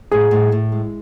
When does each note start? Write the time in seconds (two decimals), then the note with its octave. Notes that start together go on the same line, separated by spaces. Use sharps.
0.11 A2 G#4
0.31 A2
0.52 A2
0.72 G#3